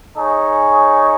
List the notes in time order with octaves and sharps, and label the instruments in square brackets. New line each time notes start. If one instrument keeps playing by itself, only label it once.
[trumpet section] D#4 G#4 C#5